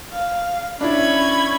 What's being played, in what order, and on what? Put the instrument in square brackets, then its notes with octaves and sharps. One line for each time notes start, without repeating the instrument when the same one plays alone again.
[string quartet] F5
[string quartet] C#4 B5 G#6 [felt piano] D4 E4